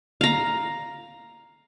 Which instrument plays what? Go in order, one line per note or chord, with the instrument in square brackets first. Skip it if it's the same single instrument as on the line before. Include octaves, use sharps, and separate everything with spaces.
[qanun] F5 A#5